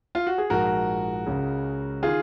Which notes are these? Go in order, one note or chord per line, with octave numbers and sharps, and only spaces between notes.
F4
F#4
G#4
A#1 G#2 F3 G#3 F#4 A#4
C#2 C#3 G#3
D#3 F4 G#4